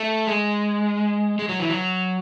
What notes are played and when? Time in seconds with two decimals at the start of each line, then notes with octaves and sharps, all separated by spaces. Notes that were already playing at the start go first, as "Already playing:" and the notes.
Already playing: A3
0.27 G#3
1.39 G#3
1.49 F#3
1.60 E3
1.70 F#3